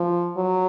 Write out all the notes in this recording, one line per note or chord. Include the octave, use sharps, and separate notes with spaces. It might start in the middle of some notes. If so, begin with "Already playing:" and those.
Already playing: F3
F#3